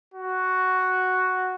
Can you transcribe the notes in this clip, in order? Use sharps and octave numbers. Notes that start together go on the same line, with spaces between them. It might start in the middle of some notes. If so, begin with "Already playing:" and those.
F#4